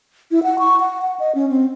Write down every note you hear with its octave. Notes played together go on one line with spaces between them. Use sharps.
E4
F#5
C#6
F#5
F#5
D#5
C#4
C4